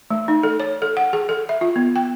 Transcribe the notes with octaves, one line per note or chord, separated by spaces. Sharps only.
A3
D#4
A4
C#5
A4
F#5
G#4
A4
E5
F4
B3
G5